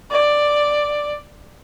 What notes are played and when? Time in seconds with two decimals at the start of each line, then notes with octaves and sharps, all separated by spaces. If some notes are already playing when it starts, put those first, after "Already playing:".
0.11 D5